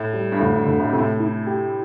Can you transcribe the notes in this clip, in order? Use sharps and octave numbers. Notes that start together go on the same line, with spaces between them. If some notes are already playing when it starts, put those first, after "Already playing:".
Already playing: A2
G3
G2
D2 A2
G2
D2 D3
A2
C3 A3
A2
E4
G4